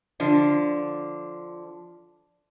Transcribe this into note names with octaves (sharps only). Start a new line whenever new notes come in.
D3 F3 D4